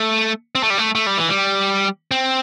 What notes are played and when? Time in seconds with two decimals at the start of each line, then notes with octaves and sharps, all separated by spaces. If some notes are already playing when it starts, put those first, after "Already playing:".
Already playing: A3
0.55 C4
0.63 A3
0.70 G3
0.78 A3
0.95 A3
1.07 G3
1.17 E3
1.29 G3
2.11 C4